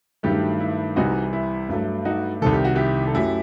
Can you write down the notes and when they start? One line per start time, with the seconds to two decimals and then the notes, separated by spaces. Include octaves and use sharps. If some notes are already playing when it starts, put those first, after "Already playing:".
0.23 G2 D#3 F#3 A3 E4 G4
0.60 E4
0.96 C2 C3 E3 G3 D#4 F#4
1.33 E4
1.69 G2 F#3 A3
2.05 D#4 F#4
2.42 C2 C3 D#3 A4
2.53 G4
2.65 F#4
2.76 E4 G4
3.07 A4
3.14 F#2 F#3 A3 E4 G4